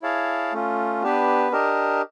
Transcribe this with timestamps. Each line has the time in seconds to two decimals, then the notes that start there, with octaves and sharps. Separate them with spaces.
0.02 E4 G#4 C#5 F5 A5
0.53 A3 C#4 F4
1.02 B3 D4 G4 B4
1.52 D4 G4 A#4 D#5